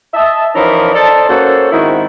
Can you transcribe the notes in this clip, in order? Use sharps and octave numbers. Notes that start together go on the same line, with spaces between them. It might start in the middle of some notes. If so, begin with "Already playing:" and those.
D#5 E5 A5
E3 F3 C#4 D#4 A#4 B4
A4 C5 D5 D#5 A5
A#3 C#4 F#4 A4 C5
G#2 D#3 C4 E4 F#4